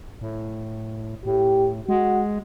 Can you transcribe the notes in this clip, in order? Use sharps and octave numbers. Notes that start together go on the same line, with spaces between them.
A2
A2 G4
G#3 F#4